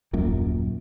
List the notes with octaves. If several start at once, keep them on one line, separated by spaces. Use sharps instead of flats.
D#1 F#2 A#2